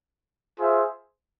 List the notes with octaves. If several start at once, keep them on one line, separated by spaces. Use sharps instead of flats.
F4 G#4 C5 E5